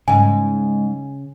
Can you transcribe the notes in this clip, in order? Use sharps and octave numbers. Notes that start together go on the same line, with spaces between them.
G#2 C#3 D#4 G#5